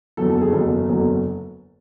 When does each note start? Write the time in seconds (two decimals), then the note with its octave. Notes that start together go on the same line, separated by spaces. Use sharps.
0.17 F#1 E2 D3 F#3 A4
0.30 A4
0.41 G#4
0.53 F#1 E2 D3 F#3 A4
0.89 F#1 E2 D3 F#3